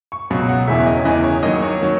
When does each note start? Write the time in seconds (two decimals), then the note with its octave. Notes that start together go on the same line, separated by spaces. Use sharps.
0.12 C#6
0.30 C#2 B2 F#3
0.49 F#5
0.67 E1 E2 C#3 E3 E5
0.80 C#5
0.87 D#5
1.05 E1 E2 C#3 E3 D#5
1.24 C#5
1.43 D#2 D#3 F#3 D#5
1.62 C#5
1.81 D#3 F#3